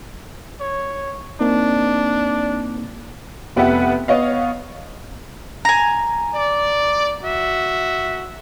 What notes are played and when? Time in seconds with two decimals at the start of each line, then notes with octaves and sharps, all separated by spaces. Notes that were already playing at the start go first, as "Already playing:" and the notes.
0.60 C#5
1.41 A#3 C4 D4 D#4
3.56 F1 B3 G4 B4 E5 F#5
4.08 B3 C#5 D#5 F5
5.65 G#5 A#5
6.34 D5
7.23 F#4 E5